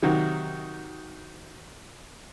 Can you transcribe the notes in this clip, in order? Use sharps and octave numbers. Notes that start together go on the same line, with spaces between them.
C3 D#3 F#3 F#4